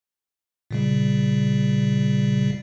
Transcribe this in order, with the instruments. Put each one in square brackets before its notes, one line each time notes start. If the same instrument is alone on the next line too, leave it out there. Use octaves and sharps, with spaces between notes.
[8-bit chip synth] A#2 C#3 G3